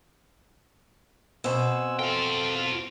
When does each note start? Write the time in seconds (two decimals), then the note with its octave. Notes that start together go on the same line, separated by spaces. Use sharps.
1.44 B2 C4 F#5 G#5 E6
1.99 F4 A4 F5 G5